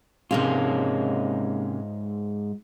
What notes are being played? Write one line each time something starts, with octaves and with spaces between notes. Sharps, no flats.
G#2 C3 G#3 A#3 C#4 F4